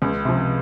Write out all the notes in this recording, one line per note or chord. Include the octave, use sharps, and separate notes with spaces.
C#2
C3 F3